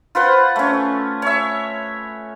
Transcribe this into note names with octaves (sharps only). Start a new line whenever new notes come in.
F4 B4 C5 F#5
A3 C#4
C#5 E5